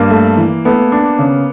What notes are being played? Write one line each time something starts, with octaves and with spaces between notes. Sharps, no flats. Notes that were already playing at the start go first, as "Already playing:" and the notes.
Already playing: G2 A#3
A3
E3
A3 B3
D4
C#3